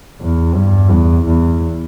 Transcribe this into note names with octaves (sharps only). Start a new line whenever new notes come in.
E2
G2
E2
E2